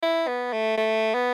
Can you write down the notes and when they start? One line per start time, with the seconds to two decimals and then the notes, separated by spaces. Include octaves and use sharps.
0.03 E4
0.28 B3
0.53 A3
0.77 A3
1.14 B3